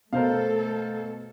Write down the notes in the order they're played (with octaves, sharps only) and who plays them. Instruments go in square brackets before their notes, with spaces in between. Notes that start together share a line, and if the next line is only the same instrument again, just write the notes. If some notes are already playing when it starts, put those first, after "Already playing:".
[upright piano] B2 [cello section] A3 A4 [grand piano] A#4 C5 F5